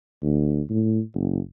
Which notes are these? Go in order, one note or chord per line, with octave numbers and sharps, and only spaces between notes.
D2
A2
F#1